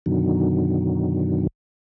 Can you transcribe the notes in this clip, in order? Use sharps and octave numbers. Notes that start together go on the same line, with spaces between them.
F#2 B2 D3 D#3 F#3